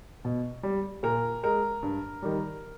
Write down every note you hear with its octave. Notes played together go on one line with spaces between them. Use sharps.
B2
G3
A#2 A#4
G#3 A#4
G2
D#3 G3